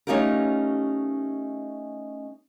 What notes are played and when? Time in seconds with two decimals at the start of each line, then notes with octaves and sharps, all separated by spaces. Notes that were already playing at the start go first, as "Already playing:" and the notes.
0.07 A3 C#4 D#4 F4 G4 A#4